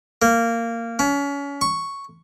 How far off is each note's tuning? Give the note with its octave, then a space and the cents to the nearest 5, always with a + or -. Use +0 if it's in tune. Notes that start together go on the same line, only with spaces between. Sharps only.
A#3 -15
C#4 +30
C#6 +0